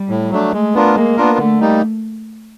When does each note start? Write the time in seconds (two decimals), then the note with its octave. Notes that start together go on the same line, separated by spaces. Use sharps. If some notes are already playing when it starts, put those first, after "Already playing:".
Already playing: G3
0.09 A2
0.30 F#3 A3 D4
0.52 G#3 A3
0.74 B3 D4 F4 A#4
0.95 G#3 A#3
1.17 B3 D4 F4 A#4
1.38 D3 A3
1.60 G3 A#3 D#4